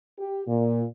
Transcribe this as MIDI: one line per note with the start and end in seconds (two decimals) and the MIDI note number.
0.19 0.42 67
0.48 0.84 46